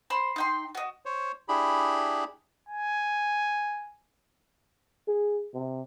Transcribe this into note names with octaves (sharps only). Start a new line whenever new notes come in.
C5 B5 C6
D#4 G5 C6
F#4 D#5
C5 C#5
D4 E4 G4 G#4 B5
G#5
G#4
C3